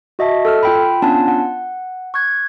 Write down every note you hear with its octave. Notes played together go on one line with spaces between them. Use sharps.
F#4 D#5 E5 A5
A4 E6 F6
F4 G5 B5
B3 C#4 D4 F4 G#5 A5
F#5
C#6 F#6 G#6